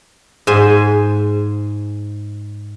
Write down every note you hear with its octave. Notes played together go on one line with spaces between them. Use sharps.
G#2 C5 G#5